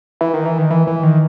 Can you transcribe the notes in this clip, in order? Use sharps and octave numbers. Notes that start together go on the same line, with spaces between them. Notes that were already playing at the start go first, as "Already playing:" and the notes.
E3
D#3
E3
D#3
E3
E3
D#3